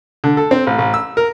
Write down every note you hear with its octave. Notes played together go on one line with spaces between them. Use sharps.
D3
A4
C4
A1
A1
E6
A#4